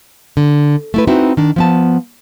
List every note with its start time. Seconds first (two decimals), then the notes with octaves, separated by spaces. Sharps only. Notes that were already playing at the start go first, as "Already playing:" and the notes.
0.37 D3
0.94 A3 E4 B4
1.07 C4 D#4 E4 F#4 B4
1.37 D#3 D4
1.56 F3 B3 A5